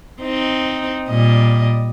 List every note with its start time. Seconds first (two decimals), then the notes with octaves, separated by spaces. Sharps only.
0.21 C4 D#4
1.08 A#2 G3 D#5